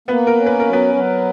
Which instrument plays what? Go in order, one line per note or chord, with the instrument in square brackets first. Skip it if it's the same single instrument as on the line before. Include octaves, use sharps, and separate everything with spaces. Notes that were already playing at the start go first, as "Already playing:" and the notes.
[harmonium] A#3 [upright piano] B3 B4
[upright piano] A#4
[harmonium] C#4
[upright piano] B4
A#4
[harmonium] F#3
[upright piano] B3 B4
[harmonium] F#3